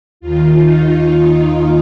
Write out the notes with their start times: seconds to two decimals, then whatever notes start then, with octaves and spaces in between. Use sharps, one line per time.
0.20 D#2 D#3 F4
0.59 D#4